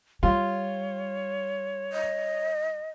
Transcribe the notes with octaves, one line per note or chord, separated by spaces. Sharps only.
G3 F4 C#5
D#5